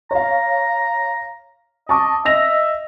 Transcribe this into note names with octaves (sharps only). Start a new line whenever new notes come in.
C#5 F5 A#5
D#5 A5 C#6 D6
D#5 E5 A#6 F7